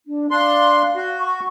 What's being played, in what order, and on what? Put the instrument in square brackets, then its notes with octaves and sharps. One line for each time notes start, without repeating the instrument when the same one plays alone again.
[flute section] D4
[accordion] D4 C6 [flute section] F5
[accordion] F#4
[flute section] C#6